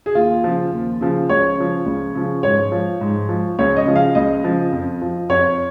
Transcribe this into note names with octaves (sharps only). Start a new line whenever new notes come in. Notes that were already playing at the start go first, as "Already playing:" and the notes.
G#4
D#2 F4
C#3 F3
D#2
C#3 F3
C#2 C#5
C#3 F3
C#2
C#3 F3
G#2 C#5
F3
G#2
F3
C#2 C#5
D#5
C#3 F3
F5
C#2 D#5
C#3 F3
F2
F3
F2 C#5